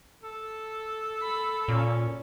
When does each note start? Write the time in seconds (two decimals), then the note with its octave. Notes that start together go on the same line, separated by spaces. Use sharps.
0.23 A4
1.22 B5
1.68 A#2 C#4